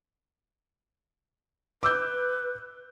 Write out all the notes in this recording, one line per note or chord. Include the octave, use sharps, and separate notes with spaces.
B4 D6 E6 G6